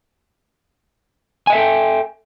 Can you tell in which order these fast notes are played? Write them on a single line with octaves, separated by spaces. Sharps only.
G#5 D#5 E5 A4 G5